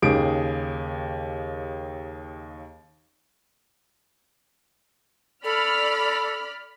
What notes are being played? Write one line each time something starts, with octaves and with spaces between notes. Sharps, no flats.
D#2 C#3 G4 G#4 D7
A4 D5 B5 F6